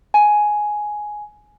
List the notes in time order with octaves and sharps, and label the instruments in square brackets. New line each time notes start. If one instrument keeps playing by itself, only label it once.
[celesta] G#5